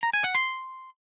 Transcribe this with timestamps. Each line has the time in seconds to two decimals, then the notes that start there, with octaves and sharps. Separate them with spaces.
0.03 A#5
0.13 G#5
0.24 F#5
0.35 C6